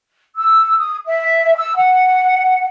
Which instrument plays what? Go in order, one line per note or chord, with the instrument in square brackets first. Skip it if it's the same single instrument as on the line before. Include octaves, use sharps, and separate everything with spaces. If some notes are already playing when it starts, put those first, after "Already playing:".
[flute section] E6
D#6
E5
E6
F#5